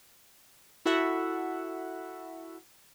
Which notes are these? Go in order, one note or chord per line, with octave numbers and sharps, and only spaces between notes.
E4 F#4 A4 E5 F#5